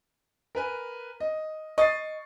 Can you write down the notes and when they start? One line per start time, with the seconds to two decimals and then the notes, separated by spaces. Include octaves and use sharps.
0.55 A#4 B4 G#5
1.20 D#5
1.78 D#5 C#6 A6 C7